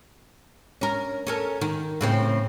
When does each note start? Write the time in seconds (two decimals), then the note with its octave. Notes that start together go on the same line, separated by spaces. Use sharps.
0.81 C#4 A#4
1.27 C#4 A4 A#4
1.61 D#3
2.01 A2 C#3 C4